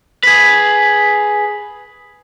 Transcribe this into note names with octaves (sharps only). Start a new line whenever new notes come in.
G#4 B4